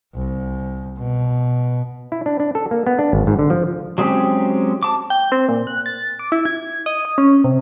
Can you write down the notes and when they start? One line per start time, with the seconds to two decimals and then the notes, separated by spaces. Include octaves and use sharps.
0.15 C2
0.98 B2
2.12 E4
2.26 D4
2.40 D4
2.55 A4
2.71 A#3
2.87 B3
2.99 D4
3.13 G#1
3.27 G#2
3.39 D3
3.50 F3
3.98 F#3 G#3 C4 C#4 G4
4.83 A5 D6
5.10 G5
5.32 C4
5.49 A#2
5.67 F#6
5.86 A6
6.19 D6
6.32 E4
6.45 G#6
6.86 D#5
7.05 D#6
7.18 C#4
7.44 C3